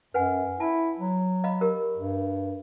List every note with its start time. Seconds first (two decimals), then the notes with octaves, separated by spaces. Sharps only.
0.14 F#2 B4 F#5 G#5
0.60 E4 A5
0.99 F#3
1.44 D#5 F5 B5
1.61 G4 A#4
1.97 G2